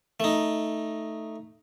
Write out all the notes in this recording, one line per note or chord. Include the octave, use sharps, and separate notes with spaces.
A3 D#4